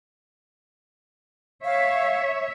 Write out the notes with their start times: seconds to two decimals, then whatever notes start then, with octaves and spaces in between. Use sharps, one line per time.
1.65 C#5 E5 F5